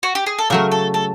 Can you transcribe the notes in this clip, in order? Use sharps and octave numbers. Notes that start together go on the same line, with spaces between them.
F#4
G4
G#4
A4
C#3 F#3 A3 A#4
A4
A4